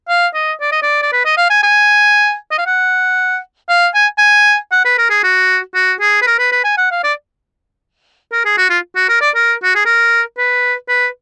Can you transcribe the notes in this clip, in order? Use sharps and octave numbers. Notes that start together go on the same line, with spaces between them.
F5
D#5
D5
D#5
D5
D5
B4
D#5
F5
G#5
G#5
D#5
F5
F#5
F5
G#5
G#5
F#5
B4
A#4
G#4
F#4
F#4
G#4
B4
A#4
B4
B4
G#5
F#5
F5
D5
A#4
G#4
F#4
F4
F#4
A#4
D5
A#4
F#4
G#4
A#4
B4
B4